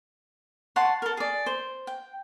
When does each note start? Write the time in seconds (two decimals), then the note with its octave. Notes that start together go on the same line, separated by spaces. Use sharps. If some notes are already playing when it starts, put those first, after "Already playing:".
0.76 C#5 F#5 A5 C6
1.02 A4 A#4
1.17 G#4 D5
1.46 C5
1.87 G5